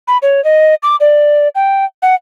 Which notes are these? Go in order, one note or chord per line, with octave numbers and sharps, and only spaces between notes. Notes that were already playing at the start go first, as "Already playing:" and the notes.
B5
C#5
D#5
D6
D5
G5
F#5